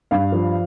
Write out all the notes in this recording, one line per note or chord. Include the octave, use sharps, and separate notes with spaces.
G2 F5
F3